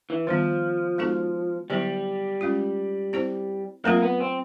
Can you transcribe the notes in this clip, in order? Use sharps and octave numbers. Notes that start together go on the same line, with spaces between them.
E3
D#3 F3 G3 B3
G#3 B3 D#4 F#4 A4
D3 F#3 G3 B3 E4 G4
G#3 C#4 F4
C4 E4 G4 C5
F#3 A3 A#3 C4 F4
B3
C4